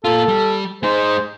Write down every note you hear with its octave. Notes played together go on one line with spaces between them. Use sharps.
A#3 F4 A4
G3
G#3 D#4 C5